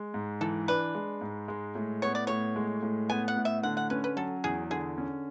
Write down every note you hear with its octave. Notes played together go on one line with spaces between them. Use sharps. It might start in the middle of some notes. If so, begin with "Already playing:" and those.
Already playing: G#3
G#2
E3 A4
D4 B4
G#3
G#2
G#3
A2
B3 C#5
D5
A2 C#5
G#3
A2
B3 G#5
F#5
A2
E5
D3 F#5
F#5
C#4 B4
B4
F#3 A4
E2 G#4
D3 G#4
C#4